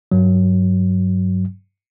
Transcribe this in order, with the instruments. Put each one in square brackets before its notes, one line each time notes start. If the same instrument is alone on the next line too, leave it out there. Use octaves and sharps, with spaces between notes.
[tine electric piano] G2 F#3